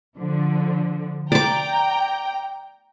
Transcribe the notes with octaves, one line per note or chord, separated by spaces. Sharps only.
D3 F3
D5 G5 A#5 D6